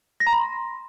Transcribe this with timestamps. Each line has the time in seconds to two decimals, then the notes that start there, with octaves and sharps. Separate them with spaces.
0.20 A#6
0.27 A#5
0.33 B5
0.39 C6